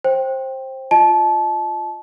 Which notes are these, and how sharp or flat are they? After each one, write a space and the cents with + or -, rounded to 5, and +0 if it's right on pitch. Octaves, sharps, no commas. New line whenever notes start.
C5 +20 G5 +0
F4 +0 D#5 +0 A5 -25